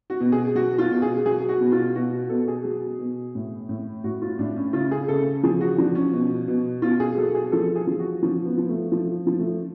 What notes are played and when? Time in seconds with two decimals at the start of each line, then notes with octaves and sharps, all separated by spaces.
0.10 F#4
0.21 B2
0.32 G#4
0.55 F#3 F#4
0.78 F4
0.91 B2
1.02 G#4
1.26 F#3 G#4
1.49 F#4
1.61 B2
1.72 F4
1.95 B2 F#4
2.29 B2 A4
2.48 G#4
2.65 F#3
2.99 B2
3.35 A2
3.69 A2
4.04 A2 F#4
4.22 F4
4.39 A2 D4
4.56 C#4
4.73 C#3 F4
4.91 G#4
5.08 C#3 A4
5.43 F3 G#4
5.61 F#4
5.78 F3 D4
5.95 C#4
6.13 B2
6.48 B2
6.82 B2 F4
7.00 G#4
7.17 F#3 A4
7.35 G#4
7.52 F3 A4
7.76 G#4
7.87 F3
7.99 F#4
8.23 F3 C#4
8.46 B3
8.57 F3
8.69 A3
8.92 F3 A3
9.27 F3
9.39 A3